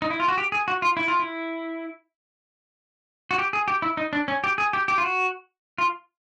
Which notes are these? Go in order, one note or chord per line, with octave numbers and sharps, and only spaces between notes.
D#4
E4
F4
F#4
G4
G#4
F#4
F4
E4
F4
E4
F#4
G4
G#4
G4
E4
D#4
D4
C#4
G4
G#4
G4
G4
F4
F#4
F4